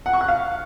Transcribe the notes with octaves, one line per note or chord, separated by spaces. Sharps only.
F#5
C#6
F#6
F5